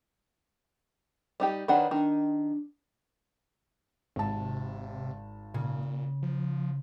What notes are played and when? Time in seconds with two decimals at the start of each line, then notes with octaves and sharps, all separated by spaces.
1.40 G3 D#4 G4
1.68 D#3 D4 B4 C#5 F#5 B5
1.91 D#3 D4
4.16 G#1 C3 A5
5.54 A#2 C#3
6.22 F3